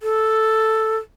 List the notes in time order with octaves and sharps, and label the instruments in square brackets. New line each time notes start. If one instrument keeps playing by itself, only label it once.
[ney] A4